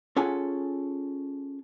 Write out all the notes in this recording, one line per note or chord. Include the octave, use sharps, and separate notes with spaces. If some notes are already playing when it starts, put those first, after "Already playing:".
C#4 F4 G#4 A4 F#5 G#5